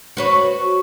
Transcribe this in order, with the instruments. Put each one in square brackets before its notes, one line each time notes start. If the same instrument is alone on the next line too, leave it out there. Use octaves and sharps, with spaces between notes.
[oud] F#4 B4 C#5